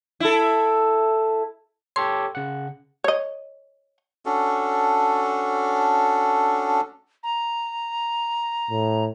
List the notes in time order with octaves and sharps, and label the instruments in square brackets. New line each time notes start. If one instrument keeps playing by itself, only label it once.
[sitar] E4 A4
[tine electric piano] G4 A4 C#5 [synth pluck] C6
[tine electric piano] C#3 F#5
[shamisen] C#5 D#5
[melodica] C#4 D4 F#4 A4
[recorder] A#5
[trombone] A2